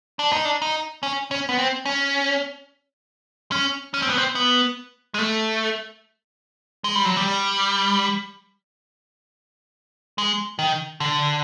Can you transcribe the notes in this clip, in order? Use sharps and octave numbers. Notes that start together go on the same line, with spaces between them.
D4
D#4
D4
D#4
C#4
C#4
B3
C4
C#4
C#4
C#4
C4
B3
C4
B3
G#3
A3
G#3
G3
F#3
G3
G#3
D#3
D3